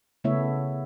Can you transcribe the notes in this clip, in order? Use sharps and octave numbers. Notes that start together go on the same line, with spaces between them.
C#3 A3 B3 E4 C#5 E5